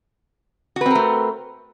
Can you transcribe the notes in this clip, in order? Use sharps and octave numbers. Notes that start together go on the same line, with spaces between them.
A3 C4 F#4 A#4 B4